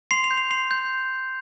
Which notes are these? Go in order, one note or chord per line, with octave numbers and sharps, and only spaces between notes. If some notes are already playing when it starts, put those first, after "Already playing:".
C6 C7 F7
C7 F7
G6
C7 F7
C6 C7 F7
G6